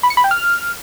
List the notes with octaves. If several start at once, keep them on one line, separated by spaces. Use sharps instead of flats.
B5
C#7
B5
G5
F6